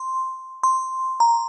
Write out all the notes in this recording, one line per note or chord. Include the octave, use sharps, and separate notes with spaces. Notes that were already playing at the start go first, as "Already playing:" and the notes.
Already playing: C6
C6
A#5